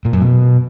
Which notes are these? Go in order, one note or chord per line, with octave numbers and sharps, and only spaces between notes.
A#2
F#2
B2